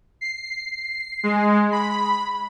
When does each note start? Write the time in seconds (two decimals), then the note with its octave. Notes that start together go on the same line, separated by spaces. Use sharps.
0.21 C7
1.23 G#3
1.72 B5